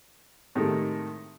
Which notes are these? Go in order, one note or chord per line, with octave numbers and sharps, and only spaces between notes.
A2 C3 D#3 G#3 A3